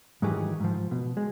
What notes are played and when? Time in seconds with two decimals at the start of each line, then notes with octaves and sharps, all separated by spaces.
0.22 G#2 D#3 E3 F#3 G4 G#4
0.60 G#2 F3
0.91 B2
1.17 G#3